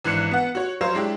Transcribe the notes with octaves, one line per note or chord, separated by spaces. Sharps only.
G#1 E3 D4 F#6 C#7 E7
B3 F#5
F#4 C#5
F#3 C5 C#5 F5
G#3 D4 E4 G4